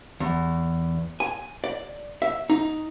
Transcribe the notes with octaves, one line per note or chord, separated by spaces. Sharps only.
E2
G#5
D5
E5
D#4